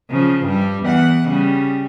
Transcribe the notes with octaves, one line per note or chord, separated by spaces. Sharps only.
C#3 F3
G2 G3
E2 F#5
C#3 G3